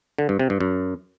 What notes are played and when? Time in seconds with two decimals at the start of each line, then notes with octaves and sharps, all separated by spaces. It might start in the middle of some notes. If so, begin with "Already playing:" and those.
0.19 D3
0.29 G2
0.39 C3
0.50 G2
0.60 F#2